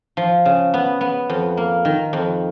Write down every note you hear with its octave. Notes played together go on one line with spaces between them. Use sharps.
F3
C#3
B3
B3
F2
A#3
D#3
F2